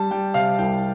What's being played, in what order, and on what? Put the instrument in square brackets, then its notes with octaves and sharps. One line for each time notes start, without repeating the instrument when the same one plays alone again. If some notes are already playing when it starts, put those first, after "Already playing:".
Already playing: [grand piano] G3 A5
G3 G5
C3 F5
C2 G5